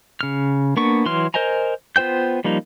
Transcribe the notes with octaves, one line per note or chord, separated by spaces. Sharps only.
C#3 F6
A#3 B3 D4 C#6
E3 F#3 C6 F6
A#4 C5 D#5 G#5 A#5
B3 F4 C5 G5 G6
F3 G3 A#3 D#4